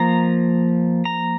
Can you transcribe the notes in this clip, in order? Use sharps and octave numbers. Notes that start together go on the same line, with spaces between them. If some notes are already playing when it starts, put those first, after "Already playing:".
Already playing: F3 A#3 A#5
A#5